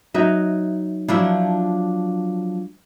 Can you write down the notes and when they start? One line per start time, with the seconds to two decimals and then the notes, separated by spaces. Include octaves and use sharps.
0.14 F#3 D#4 D#5 E5
1.09 F3 F#3 D4 E4 E5